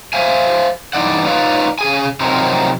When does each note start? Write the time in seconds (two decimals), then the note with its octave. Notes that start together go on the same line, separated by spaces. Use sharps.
0.13 C5 E5 F5 G#5
0.93 G2 E3 D#4 D5 F#5
1.26 D#4 F4 B4 C#5 D5 F5
1.79 C#3 G#4 G#5
2.20 C3 F3 F#3 C4 D#4 A#4